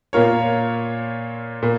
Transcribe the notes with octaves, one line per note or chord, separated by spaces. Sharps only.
A#2 A#3 F4 A#4 C#5
A#2 A#3